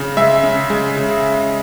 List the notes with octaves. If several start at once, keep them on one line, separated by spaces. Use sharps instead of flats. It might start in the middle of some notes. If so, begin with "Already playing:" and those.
Already playing: C#3
G#3 E5
C#3
G#3
C#3